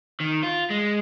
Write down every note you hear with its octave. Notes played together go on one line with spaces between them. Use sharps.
D#3
F4
G#3